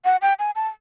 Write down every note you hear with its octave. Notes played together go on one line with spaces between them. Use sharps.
F#5
G5
G#5
A5